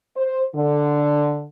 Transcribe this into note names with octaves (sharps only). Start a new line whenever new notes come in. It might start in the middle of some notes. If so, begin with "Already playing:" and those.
C5
D3